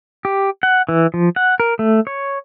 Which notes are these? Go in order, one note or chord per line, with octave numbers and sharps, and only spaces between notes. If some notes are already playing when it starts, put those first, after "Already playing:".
G4
F#5
E3
F3
F#5
A#4
A3
C#5